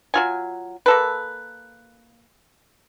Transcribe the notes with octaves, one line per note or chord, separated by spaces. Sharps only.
F#3 F4 G#5
A#3 A4 B4